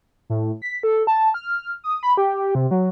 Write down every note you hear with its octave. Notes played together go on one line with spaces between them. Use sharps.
A2
B6
A4
A5
F6
D#6
B5
G4
C3
F#3